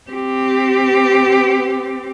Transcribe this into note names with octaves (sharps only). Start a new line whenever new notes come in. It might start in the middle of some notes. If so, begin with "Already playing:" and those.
C4 G4